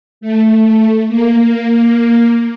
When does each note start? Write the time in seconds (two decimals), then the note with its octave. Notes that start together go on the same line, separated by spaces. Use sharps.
0.21 A3
1.08 A#3